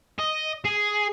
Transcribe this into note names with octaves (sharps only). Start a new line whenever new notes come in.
D#5
G#4